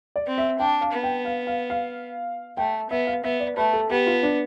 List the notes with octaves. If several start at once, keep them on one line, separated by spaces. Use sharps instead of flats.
D5
C4
E5
D4 G5
F5
B3
G5
F5
F5
F5
A3 G5
B3 E5
F5
B3 E5
D5
A3 B4
A4
B3 G4
F4
D4